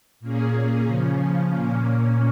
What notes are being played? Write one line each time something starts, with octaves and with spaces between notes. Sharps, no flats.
A#2 A#3 C#4 G#4
C#3 F3 C#4
A#2 A#3 C#4